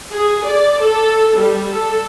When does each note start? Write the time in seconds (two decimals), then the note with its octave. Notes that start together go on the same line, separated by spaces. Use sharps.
0.11 G#4
0.44 D5
0.81 A4
1.36 G3
1.71 A4